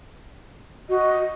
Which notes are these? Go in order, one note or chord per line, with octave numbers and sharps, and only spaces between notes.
F#4 D#5